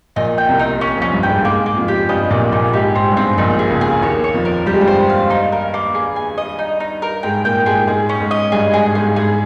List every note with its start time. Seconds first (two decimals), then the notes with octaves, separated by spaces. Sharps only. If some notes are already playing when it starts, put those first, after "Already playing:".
0.16 A#1 A#2 D#4
0.38 G5
0.49 C2 C3
0.59 D#4
0.81 C#4
0.97 F2 F3 C#4
1.13 G2 G3
1.23 G5
1.29 G#2 G#3
1.45 G#2 G#3 A#3
1.66 A#3
1.77 F2 F3
1.88 G4
2.09 G2 G3 D#5
2.30 A#1 A#2 A#3
2.52 A#1 A#2 D#4
2.73 G#2 G4
2.95 G#2 C4
3.12 G2
3.17 G#2 C4
3.37 A#1 A#2 D#4
3.59 G#4
3.70 C#2 C#3
3.81 G#4
4.02 D#2 D#3 C#5
4.24 C#5
4.34 F2 F3
4.45 A#4
4.66 G3 G4
4.74 G#3
4.81 G2 G3
4.87 C5
5.09 F5
5.30 D#4
5.52 A#4
5.74 A#3
5.95 G#4
6.16 G#5
6.38 D#5
6.59 D#4
6.80 D#4
7.02 A#4
7.23 G#2 G#3 G5
7.45 A#2 A#3 G5
7.66 G#2 G#3 G#4
7.87 G#2 G#3 G#4
8.09 C#4
8.20 G#2 G#3
8.31 D#5
8.52 G2 G3 G#4
8.73 G#2 G#3 G#4
8.95 G#2 G#3 G#4
9.16 G#2 G#3 G#4